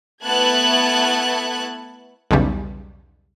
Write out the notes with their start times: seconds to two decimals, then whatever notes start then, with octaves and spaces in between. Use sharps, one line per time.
0.24 A3 B3 E4 A5 F#6 G#6
2.31 B1 E2 C#3 G3